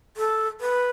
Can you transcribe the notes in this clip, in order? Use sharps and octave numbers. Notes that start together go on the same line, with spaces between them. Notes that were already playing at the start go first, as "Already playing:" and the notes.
A4
B4